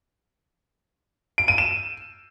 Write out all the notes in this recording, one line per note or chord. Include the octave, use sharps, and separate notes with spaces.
D7
D#7
E7